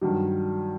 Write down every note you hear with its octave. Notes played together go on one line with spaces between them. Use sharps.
G2 D#3 F#3